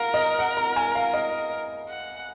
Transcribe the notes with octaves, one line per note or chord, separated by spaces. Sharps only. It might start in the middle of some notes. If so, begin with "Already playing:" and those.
Already playing: A#4 F5 F#5
D#5
F#5
A#5
G#5
F5
D#5
F#5